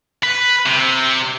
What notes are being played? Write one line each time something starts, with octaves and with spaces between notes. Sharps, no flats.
B4
C3